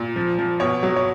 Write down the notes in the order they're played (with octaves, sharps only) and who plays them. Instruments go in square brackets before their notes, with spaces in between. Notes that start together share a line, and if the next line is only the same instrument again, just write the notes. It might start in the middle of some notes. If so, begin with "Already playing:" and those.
Already playing: [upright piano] A#2
F3
F3
B2 C#5
F#3
C#5